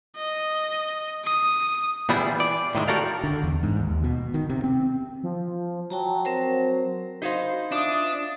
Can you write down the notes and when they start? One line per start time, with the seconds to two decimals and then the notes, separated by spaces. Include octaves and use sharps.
0.16 D#5
1.24 D#6
2.09 A#2 E3 G3 B3 E4 G#4
2.40 D5
2.75 A2 D#3 F#3 G#3
2.88 F#4 G4 A4 A#4 D5 F5
3.24 D3
3.44 E2
3.63 G#2
3.80 D#2
4.04 B2
4.34 D#3
4.50 C3
4.64 C4
5.23 F3
5.90 F#3 G5 A5 A#5
6.25 C4 A#4 C5
7.22 D#4 F#4 C5 D#5 F5
7.72 D4 F4 E5 D#6